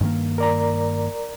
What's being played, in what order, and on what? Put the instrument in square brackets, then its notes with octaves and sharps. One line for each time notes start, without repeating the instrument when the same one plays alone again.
[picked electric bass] G2 D#3 A#3
[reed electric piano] A#4 D5 A#5